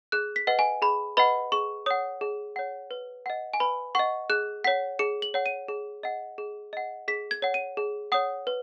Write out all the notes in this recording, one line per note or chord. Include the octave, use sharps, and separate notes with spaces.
G#4 F#6
B6
B4 D#5 F#5
G#5
G#4 B5
B4 D#5 F#5 B5
G#4 C#6
C#5 F#5 D#6
G#4
C#5 F#5
B4
D#5 F#5
G#5
B4 B5
D#5 F#5 C#6
G#4 F#6
C#5 F#5 B6
G#4 C#7
F#7
C#5 F#5
D#7
G#4
D#5 F#5
G#4
D#5 F#5
G#4 B6
G#6
C#5 F#5
D#7
G#4
C#5 F#5 D#6
B4